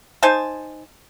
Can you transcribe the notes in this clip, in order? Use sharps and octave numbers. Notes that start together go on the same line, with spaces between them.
D#4 C5 G#5 A5